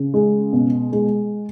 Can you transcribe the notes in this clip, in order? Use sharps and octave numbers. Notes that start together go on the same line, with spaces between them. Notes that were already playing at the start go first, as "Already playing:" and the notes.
Already playing: C#3
G#3
B2
G#3